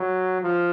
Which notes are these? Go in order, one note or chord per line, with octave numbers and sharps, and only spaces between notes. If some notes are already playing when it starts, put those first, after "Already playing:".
Already playing: F#3
F3